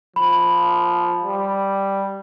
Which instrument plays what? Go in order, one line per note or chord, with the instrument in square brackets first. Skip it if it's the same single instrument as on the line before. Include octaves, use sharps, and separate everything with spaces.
[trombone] F3 [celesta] B5
[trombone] G3